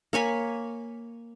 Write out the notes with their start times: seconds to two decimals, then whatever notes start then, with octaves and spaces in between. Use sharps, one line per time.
0.13 A#3 C#5 G#5 B5